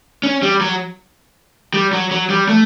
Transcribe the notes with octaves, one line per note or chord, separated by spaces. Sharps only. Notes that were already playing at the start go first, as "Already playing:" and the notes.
C#4
G3
F#3
G3
F#3
F#3
G3
A3